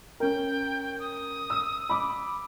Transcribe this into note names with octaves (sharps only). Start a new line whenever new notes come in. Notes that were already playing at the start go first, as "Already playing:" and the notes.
C#4 A#4 G5
D#6
E6 D#7
B5 D6